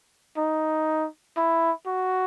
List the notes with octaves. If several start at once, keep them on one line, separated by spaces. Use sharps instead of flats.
D#4
E4
F#4